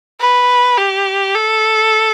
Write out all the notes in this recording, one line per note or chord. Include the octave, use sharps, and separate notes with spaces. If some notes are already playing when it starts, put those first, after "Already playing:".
B4
G4
A4